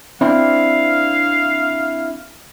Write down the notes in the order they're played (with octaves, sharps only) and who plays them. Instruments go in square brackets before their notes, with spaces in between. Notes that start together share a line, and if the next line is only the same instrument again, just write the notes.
[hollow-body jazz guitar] C4 D4 E4 [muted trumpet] F5